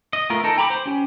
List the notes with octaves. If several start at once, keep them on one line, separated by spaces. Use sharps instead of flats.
D#5
A3 B3 F4 A#4
D#4 A4 A#4
G5 A#5 B5 C#6 D6
C5
C#4 G4